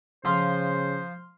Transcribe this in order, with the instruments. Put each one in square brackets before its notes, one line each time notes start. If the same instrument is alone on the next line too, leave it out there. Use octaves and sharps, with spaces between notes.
[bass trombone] C#3 [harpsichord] F3 [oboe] C5 [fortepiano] C6 F6